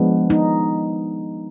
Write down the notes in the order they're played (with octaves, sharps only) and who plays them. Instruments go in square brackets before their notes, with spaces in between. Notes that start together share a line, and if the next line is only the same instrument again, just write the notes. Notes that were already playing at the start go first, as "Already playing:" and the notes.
Already playing: [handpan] F3 G#3 B3 D4
D#4